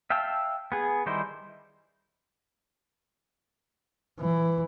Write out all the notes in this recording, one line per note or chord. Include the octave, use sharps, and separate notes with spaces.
E5 F5 G5 A5 E6
B3 G#4
D#3 G3 D#4 E4 C5
E3